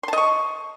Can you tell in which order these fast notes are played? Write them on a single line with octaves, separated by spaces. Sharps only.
C6 A5 D#5 C#6